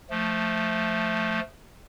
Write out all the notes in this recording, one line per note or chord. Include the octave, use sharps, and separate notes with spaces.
F3 A3